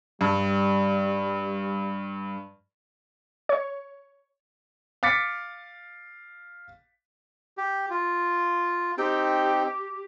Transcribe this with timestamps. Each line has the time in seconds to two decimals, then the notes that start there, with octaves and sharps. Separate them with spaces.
0.21 G2 G3
3.49 C#5
5.03 F5 D6 A6 B6 C#7
7.57 G4
7.90 F4
8.98 C4 D#4 G4 G5